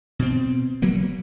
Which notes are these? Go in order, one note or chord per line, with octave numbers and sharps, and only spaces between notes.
B2 C4
F#1 F#3 A#3 B3